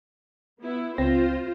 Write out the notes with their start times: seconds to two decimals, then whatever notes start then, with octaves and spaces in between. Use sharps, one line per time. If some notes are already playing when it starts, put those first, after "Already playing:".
0.60 B3 E4
0.98 C#2 C4 F4 C5 A#6